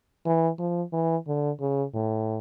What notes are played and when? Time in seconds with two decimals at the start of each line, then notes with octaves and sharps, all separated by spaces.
0.26 E3
0.59 F3
0.93 E3
1.27 D3
1.60 C#3
1.94 A2